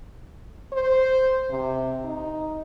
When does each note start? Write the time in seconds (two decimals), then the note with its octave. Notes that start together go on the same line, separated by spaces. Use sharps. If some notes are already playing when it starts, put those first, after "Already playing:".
0.73 C5
1.50 C3
2.04 D#4